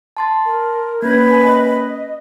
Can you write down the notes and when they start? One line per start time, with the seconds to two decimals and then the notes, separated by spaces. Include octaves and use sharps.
0.17 A5 C6 A6
0.46 A#4
1.02 A#3 C#4 B4 G#6
1.31 G#5
1.43 D#5